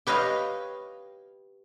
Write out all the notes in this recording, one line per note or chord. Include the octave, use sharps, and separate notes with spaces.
G4 B4 C#5 D#5 F5